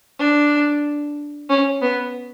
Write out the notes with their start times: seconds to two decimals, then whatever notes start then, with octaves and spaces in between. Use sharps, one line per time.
0.19 D4
1.49 C#4
1.82 B3